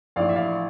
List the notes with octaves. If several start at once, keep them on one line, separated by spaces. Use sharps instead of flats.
A#1 A2 E3 D5 F5
E5
D5 F5